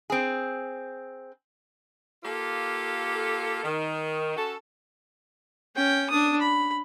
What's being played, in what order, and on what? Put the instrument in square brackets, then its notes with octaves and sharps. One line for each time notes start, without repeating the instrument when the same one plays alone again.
[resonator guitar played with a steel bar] C4 G#4
[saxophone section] A#3 F4 G4 A4
D#3
C#4 F#4 A4
[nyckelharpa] C#4 G5
D4 D#6
B5